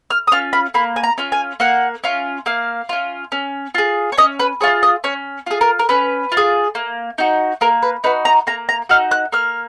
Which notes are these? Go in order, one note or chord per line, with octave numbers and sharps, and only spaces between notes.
F6
D#6
C#4 F4 F6
B5
A#3 B5
G#5
A#5
C#4 F4
G#5
A#3 F#5
C#4 F4
A#3 F5
C#4 F4
C#4
F4 G#4
C#5
C#4 D#5
B4
F4 G#4 C#5
D#5
C#4 C#5
F4 G#4
A#4
A#4
C#4 B4
F4
G#4
A#3
D#4 F#4
A#3 A#4
B4
D#4 F#4 B4
A#5
A#3 A#5
A#5
D#4 F#4 F6
F#6
A#3 F6